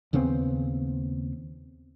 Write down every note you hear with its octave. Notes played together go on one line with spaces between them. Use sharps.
D#2 C#3 B3 C4